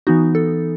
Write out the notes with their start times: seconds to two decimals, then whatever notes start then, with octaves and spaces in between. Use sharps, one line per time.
0.07 E3 B3 D#4 F#4
0.35 A4